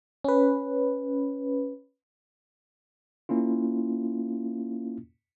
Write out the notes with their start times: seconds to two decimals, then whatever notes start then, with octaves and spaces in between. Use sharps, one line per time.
0.24 C#4 B4
3.29 A#3 C#4 E4 F4